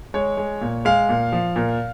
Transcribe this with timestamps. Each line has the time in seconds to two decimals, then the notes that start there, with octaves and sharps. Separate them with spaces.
0.14 G#3 C#5
0.37 G#3
0.61 A#2
0.85 G#3 F5
1.09 A#2
1.32 F3
1.56 A#2